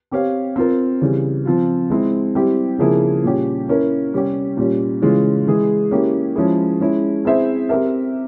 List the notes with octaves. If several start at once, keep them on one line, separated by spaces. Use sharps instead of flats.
C4 G4 C#5 F5
C4 F4 A#4
C#3 E3 G3
F3 C4 F4
G#3 C4 E4
G3 C4 E4 G4
C#3 F3 A#3 E4 G#4
A#2 G3 C#4 G4
A#3 C#4 E4 A#4
C3 G3 C#4 G4
A#2 G3 C#4
C#3 E3 G#3 C#4 F4
E3 G#3 E4 G#4
A#3 C#4 E4 G4
F3 G#3 C#4 E4 G#4
G#3 C#4 E4
C4 E4 G#4 C5 E5
C4 G4 A#4 E5